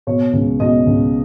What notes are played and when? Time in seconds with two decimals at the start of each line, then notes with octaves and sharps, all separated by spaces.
0.07 B2 C#5
0.33 C#2
0.60 B2 D#5
0.86 C#2